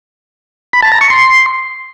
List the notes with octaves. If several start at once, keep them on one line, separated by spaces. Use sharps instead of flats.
B5
A5
A#5
C#6
C6